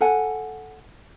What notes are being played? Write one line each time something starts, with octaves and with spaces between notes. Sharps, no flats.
A4 F#5 G#5